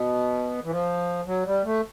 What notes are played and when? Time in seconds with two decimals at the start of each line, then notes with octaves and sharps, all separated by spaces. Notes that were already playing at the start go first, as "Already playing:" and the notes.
Already playing: B2
0.64 E3
0.71 F3
1.27 F#3
1.45 G3
1.65 A3